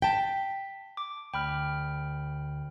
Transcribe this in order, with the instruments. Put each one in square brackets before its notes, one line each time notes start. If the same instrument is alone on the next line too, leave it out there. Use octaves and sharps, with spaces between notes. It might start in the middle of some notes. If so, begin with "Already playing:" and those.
[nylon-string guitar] G5 A5 [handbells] B6
[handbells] D6
[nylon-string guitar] D2 [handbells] G5 B5 F6